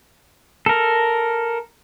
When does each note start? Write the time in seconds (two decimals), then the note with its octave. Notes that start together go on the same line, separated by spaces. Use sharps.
0.66 A4 A#4